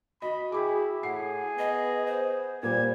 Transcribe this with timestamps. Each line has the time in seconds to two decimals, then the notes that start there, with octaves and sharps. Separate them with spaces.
0.22 F#4 D#5 B5
0.52 E4 G#4 G5 B5 D6
1.03 A2 G#4 F#5 C7
1.58 B3 D#5
2.07 C5
2.63 A#2 G3 C5 G#6